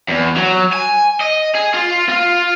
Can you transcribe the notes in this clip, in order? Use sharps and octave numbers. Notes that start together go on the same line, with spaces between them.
E2
F#3
G#5
D#5
G#4
F4
F4